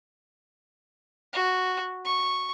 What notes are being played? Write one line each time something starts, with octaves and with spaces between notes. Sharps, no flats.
F#4
C#6